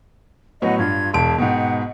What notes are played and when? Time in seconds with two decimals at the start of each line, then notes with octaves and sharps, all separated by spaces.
0.62 A2 F#3 B3 D#5 F#5
0.79 G2 F4 G#6
1.13 E1 F5 A5 D7
1.38 G#2 B2 F#5 G5